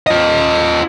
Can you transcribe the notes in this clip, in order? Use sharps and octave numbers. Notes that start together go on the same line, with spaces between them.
F4 D#5